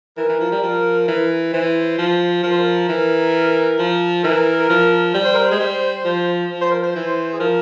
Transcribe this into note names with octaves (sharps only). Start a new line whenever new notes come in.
E3 A#4
E3
F3
G3
F3
E3
E3 C5
F3
F3 A#4
C5
A#4
E3
F3
E3 A#4
F3
G3
C5
A#4
C5
G#3
G3
F3
F3
C5
A#4
C5
E3
G#4
F3 A#4